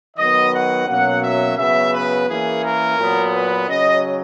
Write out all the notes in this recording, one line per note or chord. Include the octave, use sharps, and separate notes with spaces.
D#3 F#3 B3 D#5
F#5
B2 F#3 A#3 C#4 F#5
E5
C#3 F#3 B3 E5
B4
E3 A#3 C#4 G#4
A#4
A#2 F#3 B3
B4
C#3 F#3 C#4 D#5